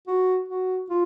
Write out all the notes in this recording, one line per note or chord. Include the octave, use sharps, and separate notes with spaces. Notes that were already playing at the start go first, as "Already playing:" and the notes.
F#4
F#4
F4